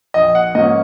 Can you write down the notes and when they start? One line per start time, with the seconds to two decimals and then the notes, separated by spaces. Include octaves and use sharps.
0.14 A#1 D#5
0.35 F#5
0.55 G#2 F3 A#3 C#4 D#5